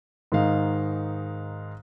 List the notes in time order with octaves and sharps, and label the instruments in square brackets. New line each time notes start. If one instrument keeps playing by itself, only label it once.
[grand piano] G#2 D#3 D#4 F5